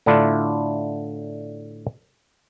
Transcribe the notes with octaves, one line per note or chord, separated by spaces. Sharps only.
A2 D3 A3 D4 E4 F4